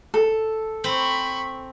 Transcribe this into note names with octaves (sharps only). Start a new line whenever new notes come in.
A4
C4 B5 C#6